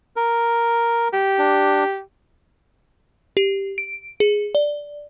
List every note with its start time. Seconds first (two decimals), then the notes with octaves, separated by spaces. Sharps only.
0.16 A#4
1.13 G4
1.39 D4
3.37 G4
3.78 D7
4.20 G#4
4.55 D5